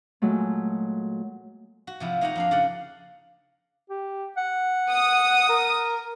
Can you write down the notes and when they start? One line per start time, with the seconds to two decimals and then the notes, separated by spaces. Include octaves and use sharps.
0.22 A#2 F#3 G#3 A3
1.87 F#4
2.00 C3 F3 E4
2.21 A#3 D#4 C#5 F#5 A#5
2.35 F2 D4 F5
2.51 C#3 D5 F#5
3.90 G4
4.37 F#5
4.90 D#6
5.49 A#4